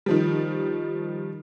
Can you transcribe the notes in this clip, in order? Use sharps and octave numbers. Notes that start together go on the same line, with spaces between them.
D#3 F3 G3